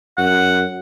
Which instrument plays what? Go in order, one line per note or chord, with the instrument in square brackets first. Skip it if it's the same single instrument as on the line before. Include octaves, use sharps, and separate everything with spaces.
[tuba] F#2 [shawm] F#5